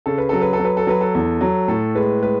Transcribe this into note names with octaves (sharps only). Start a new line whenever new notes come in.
C#3 A4
B4
F#3 A4
B4
A4
F#3
B4
A4
F#3 B4
A4
E2
F#3
A2 A4
G#3 B4
G#3 B4